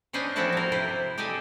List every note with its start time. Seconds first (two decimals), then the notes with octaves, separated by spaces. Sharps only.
0.13 C#4 D4 B4 C5 D#5 G#5
0.36 F3 B3 C4 E4 F#4 A5
0.52 A4 A#4
0.72 C3 E4 B4 C5
1.18 G4 A4 D5 D#5 G#5